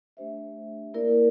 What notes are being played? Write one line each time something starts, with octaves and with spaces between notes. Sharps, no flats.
A3 D4 G4 C5 E5
A#3 E4 A#4 D5